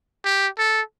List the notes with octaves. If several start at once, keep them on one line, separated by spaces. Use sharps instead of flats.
G4
A4